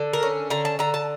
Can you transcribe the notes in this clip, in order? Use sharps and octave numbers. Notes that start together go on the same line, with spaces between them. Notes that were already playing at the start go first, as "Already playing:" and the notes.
Already playing: D3
A#4
C#4
D3 A#5
A5
D3 A#5
A5